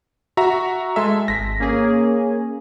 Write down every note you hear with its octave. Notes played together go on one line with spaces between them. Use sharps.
F#4 E5 A#5
G#3 A4 E5 C6
G#1 A#6 B6
A#3 C#4 G#4